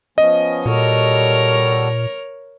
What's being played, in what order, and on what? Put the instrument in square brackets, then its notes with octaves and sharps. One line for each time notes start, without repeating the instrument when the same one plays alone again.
[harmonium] F3 B3 C#4 [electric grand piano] D#5
[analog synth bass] A#2 [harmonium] G3 F#4 A4 [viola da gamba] A#4 C#5